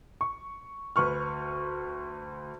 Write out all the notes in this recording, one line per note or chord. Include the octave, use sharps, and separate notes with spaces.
C#6
D2 B4 C#6 F6